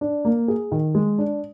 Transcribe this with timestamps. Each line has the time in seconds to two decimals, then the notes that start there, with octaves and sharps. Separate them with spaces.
0.01 D4
0.25 A#3
0.48 G#4
0.72 D#3
0.95 G#3
1.18 D4